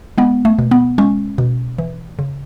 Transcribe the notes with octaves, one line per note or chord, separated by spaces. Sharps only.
G#3 B3
A3
B2
B3
G#3 C#4
B2
E3
C#3